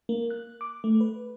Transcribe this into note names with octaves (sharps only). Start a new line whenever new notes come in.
A#3
F#6
D6
A3
B4